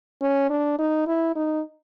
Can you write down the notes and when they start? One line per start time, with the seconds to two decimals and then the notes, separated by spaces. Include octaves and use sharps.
0.21 C#4
0.50 D4
0.79 D#4
1.07 E4
1.35 D#4